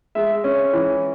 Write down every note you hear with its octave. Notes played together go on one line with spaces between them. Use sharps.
G#3 E5
C#4
E3